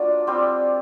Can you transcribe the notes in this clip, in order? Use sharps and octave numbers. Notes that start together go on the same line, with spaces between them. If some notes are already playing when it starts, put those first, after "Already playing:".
Already playing: F#3 A#3 D4 F4 D5
G3 C4 F4